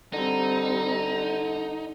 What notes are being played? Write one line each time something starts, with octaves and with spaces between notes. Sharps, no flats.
D3 G3 C4 D#4